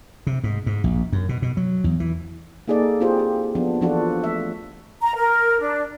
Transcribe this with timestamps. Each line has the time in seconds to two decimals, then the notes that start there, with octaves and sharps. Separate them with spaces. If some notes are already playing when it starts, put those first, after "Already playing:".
0.27 C3
0.44 G#2
0.66 G#2
0.84 A#1
1.13 F#2
1.29 B2
1.42 B2
1.57 F#3
1.84 E2
2.00 E3
2.68 A#3 D#4 G#4 A4 D5
3.00 C4 E4 F4 G4 G#4 C5
3.19 G4
3.55 F3 B3 D4
3.81 E3 F3 D4 F4 F#4 A4
4.24 A3 E5
5.02 A#5
5.16 A#4
5.60 D4